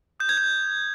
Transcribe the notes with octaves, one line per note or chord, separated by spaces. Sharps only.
D#6 G6
G#6
G6